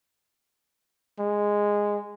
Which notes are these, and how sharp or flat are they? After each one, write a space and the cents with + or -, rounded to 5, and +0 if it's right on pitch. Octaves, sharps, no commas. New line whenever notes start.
G#3 -10